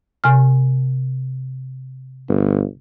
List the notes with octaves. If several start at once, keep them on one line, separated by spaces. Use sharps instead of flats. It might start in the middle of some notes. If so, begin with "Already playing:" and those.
C3 G#5 F6
G1